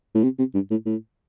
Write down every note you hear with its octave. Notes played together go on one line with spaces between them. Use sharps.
A2
C3
C3
G2
A2
A2